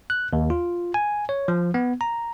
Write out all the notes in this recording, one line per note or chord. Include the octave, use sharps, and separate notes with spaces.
F#6
D#2
F4
G#5
C#5
F3
B3
A#5